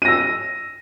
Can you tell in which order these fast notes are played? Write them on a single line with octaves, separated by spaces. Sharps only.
D#7 A#6 E6